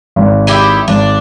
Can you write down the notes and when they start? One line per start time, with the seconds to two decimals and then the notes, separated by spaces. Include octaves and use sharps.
0.16 G#1
0.47 D#4 E4 G4
0.88 G#1 D4